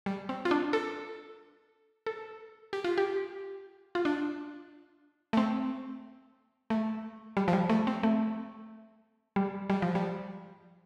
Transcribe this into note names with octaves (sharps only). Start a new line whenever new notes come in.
G3
C4
F4
D4
A4
A4
G4
F4
G4
F4
D4
A3
C4
A3
G3
F3
G3
A3
C4
A3
G3
G3
F3
G3